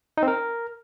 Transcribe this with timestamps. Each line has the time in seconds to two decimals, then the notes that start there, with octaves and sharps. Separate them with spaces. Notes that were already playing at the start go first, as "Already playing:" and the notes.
0.17 D#4
0.23 C4
0.28 A#4